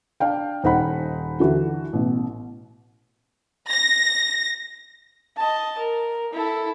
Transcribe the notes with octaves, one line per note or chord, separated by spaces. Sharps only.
D4 F5 G5
D#1 D#4 C5 F#5 B5
D3 E3 F#4
A1 B2
A#6
D#5 A5
A#4
E4 A4